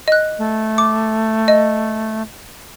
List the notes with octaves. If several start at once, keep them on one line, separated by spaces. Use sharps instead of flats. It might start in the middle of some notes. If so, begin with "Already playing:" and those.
D#5 F#6
A3
D6
D#5